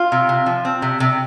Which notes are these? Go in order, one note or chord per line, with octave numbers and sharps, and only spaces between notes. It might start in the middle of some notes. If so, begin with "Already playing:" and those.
Already playing: F4
C3
C3
F3
C4
C3
C3